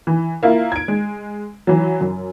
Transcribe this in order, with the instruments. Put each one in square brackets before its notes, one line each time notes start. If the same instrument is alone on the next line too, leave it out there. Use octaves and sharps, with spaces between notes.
[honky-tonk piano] E3
A#3 E4 F4
G#6 D7
G#3
E3 F#3
F#2